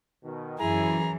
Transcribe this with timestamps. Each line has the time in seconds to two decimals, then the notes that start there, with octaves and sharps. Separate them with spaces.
0.24 B2 D#3
0.59 F#2 E3 E4 G#4 A#5